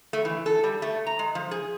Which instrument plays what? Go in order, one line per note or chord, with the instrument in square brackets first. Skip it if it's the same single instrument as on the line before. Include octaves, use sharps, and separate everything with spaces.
[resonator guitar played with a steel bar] A3
E3
A4
G3
A3
A#5
G#3
F3
G#4